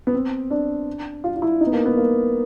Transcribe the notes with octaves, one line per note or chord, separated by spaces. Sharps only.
B3
C4
D4
F4
F4
E4
D#4
B3
A#3
B3
A#3